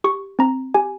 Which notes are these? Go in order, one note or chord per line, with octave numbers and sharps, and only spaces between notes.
G4 C#6
C4 A#5
G4 G#5